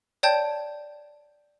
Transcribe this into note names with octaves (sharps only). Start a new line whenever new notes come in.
C#5 D5 G5 A5 G6 G#6